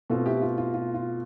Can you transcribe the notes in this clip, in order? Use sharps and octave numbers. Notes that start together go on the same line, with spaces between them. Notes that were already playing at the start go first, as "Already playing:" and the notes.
B2 A3 C4 F4 A4
E4 G4
F4
F4
F4
F4